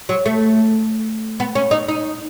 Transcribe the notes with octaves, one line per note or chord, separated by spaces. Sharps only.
F#3
A3
B3
C#4
D#4
D#4